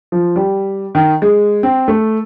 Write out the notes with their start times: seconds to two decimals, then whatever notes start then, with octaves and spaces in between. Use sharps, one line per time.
0.12 F3
0.36 G3
0.95 D#3
1.22 G#3
1.63 C4
1.88 A3